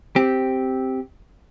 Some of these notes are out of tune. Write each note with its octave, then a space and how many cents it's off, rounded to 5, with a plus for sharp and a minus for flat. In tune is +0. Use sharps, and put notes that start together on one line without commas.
C4 +0 G4 +0